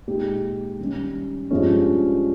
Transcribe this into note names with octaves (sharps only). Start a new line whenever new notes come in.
A#2 G#3 D#4 G4
D#3 G3 C#4
G2 F3 G#3 C#4